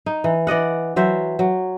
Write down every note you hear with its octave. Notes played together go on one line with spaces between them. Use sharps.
D#4
E3
E3 D5 D#5 F#5
E3 F#3 C5 E5
F#3